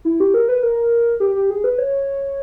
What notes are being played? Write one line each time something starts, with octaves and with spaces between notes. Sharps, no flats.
E4
G4
A#4
B4
A#4
G4
G4
G#4
B4
C#5